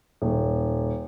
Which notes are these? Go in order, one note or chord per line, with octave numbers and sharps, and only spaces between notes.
D#1